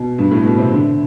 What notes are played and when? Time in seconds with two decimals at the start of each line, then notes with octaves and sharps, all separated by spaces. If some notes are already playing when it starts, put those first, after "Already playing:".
Already playing: B2
0.18 G2
0.31 A2
0.45 B2
0.58 C3
0.71 D3